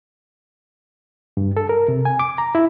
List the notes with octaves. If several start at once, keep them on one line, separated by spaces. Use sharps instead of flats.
G2
A4
A#4
C3
G#5
D6
A#5
E4